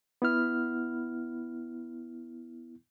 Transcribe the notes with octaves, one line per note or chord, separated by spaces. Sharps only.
B3 E4 F6